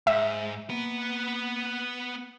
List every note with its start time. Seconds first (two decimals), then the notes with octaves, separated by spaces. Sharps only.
0.07 G#2 E5
0.70 A#3 B3 B4